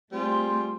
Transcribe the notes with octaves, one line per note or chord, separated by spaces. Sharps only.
G3 A3 C4 F4 G#4 C5